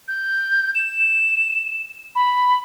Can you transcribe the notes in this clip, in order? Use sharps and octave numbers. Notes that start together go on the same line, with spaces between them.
G6
E7
B5